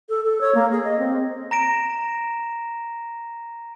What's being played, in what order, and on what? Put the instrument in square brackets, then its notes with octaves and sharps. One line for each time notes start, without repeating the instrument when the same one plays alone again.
[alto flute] A4
A4
C#5
A#3
G#4
D#5
C4
[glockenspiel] A#5 A#6 D7 E7